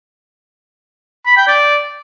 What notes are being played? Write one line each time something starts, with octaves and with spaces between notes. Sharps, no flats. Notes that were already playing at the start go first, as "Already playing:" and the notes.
B5
G5
D5